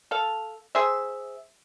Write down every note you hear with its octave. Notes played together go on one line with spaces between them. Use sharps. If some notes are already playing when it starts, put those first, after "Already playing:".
A4 F5
G#4 C5 E5